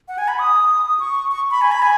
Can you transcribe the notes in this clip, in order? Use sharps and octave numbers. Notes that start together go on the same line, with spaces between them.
F#5
G#5
B5
D#6
C#6
C#6
B5
G#5
B5
G#5